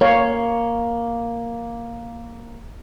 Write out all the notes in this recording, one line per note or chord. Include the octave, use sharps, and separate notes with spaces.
A#3 C#5 F5